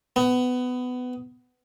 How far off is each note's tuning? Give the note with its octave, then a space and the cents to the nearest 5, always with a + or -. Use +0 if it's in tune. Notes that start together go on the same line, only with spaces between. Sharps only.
B3 +20